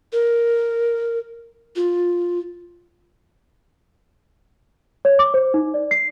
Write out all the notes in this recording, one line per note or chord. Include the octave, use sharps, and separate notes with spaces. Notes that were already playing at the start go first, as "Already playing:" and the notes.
A#4
F4
C#5
D6
C5
D#4
D5
C7